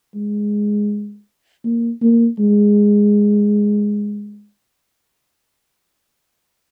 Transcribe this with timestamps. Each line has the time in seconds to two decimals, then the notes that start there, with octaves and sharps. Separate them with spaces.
0.15 G#3
1.65 A#3
2.02 A#3
2.39 G#3